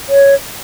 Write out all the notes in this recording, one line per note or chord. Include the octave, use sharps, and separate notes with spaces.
C#5